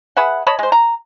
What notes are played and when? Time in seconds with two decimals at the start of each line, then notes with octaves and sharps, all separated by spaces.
0.17 G#4 B4 E5 F#5
0.47 C#5 D#5 A5 B5
0.59 G#3 C5
0.72 A#5